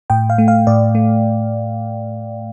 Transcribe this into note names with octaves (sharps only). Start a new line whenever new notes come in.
A2 G5
F5
A3
F5
A2 D5
A3